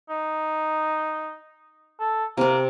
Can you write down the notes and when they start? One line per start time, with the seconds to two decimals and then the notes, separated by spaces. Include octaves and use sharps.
0.09 D#4
2.00 A4
2.37 C3 A#3 C4